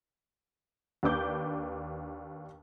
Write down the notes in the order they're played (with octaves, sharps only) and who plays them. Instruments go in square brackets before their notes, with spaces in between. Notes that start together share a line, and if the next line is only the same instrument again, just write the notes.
[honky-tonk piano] D#2 D4 B4 D6 G6